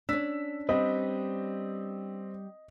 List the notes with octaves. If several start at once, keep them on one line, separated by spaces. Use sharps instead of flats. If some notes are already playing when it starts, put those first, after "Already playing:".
C#4 D4 E6 B6
G3 C4 B4 D#5